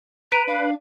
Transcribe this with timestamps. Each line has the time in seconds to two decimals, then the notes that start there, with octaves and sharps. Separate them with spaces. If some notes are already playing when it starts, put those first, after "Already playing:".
0.32 B4 A#5 B6 D7 D#7
0.47 D4 F5